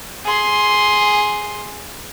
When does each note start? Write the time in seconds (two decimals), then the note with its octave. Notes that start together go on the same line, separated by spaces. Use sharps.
0.25 G#4 C6